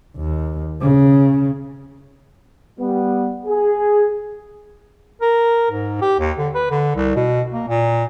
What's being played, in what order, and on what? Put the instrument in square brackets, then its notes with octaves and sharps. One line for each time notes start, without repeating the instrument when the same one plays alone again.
[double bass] D#2
C#3
[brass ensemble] G3 B3
G#4
[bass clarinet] A#4
G#2
G4
D#2
D3
B4
D3
C2
B2
A#3
A#2